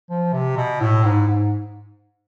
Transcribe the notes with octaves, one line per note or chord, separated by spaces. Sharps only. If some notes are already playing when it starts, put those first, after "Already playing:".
F3
C3
B2
A2
G#2
G#2